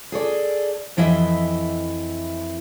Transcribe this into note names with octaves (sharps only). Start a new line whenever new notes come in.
G#4 A4 C#5 D5
F2 E3 E4 D#5 E5